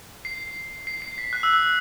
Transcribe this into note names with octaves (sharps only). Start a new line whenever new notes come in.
C7
C7
C7
B6
F#6
E6
F#6